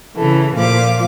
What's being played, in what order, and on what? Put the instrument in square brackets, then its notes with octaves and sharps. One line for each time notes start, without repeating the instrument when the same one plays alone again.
[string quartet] C#3 E3 [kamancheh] A4
[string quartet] A#2 F3 D6 [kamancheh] F5